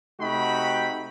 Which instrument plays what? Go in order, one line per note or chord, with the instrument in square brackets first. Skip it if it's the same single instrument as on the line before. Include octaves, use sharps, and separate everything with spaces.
[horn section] C3 A3 D#4 F#4 G5 B5